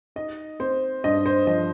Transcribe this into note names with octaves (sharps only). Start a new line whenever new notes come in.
D#4 D#5
C4 C5
G2 D#5
C5
F3 D#5